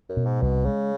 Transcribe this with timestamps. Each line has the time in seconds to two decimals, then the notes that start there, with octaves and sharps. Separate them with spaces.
0.09 F#2
0.17 B2
0.26 G#2
0.42 C2 B2
0.66 C#3 G#3